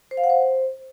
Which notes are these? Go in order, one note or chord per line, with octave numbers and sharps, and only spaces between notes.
C5
F5
F#5
C5